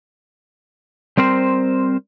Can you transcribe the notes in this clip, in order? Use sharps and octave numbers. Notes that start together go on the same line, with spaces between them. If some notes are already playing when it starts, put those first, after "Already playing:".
G3 C4 A#4 C5